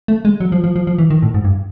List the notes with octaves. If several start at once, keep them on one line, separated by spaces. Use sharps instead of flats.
A3
G#3
F#3
F3
F3
F3
F3
E3
D#3
A2
G#2
G2